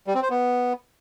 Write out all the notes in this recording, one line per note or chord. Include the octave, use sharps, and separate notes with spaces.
G3
C4
C5
B3